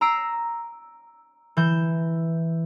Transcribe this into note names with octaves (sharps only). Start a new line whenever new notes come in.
A#5 E6 C7 D7
E3 G6 E7